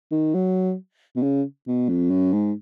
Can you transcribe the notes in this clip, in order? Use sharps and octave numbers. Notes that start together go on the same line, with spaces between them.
D#3
F#3
B2
C#3
B2
F2
F#2
G#2